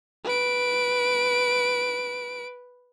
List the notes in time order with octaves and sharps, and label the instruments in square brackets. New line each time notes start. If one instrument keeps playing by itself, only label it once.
[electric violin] B4 D7